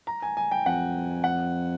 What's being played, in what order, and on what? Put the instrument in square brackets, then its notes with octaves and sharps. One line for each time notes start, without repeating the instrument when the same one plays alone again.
[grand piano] A#5
G#5
G#5
G5
[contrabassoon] F2 [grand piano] F#5
[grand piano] F#5